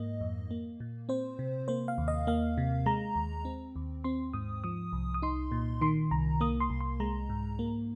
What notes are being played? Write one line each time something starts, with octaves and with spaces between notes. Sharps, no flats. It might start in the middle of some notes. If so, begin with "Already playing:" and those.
Already playing: G#2 A#3 D#5
F2
A#3
A#2
C4 C5
C3
A#3 C5
F5
D#2
D#5
A#3 F5
C3
G#3 A#5
D#2
C4
D#2
C4 C6
G#2 D#6
F3 D#6
C2
D#6
D#4 C6
A#2
D#3 C6
C2 A#5
A#3 D#6
C6
C2
C6
G#3 A#5
G#2
A#3